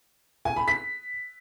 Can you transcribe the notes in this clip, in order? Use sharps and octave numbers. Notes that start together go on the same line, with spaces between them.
G#5
B5
B6